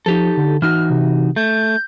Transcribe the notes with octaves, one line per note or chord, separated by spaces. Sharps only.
F3 D#4 G4 A4
D3
E3 D#4 F#4 F6
C3
A3 G6